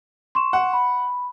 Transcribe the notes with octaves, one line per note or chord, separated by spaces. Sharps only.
C6 C#6 E7
F#5
B5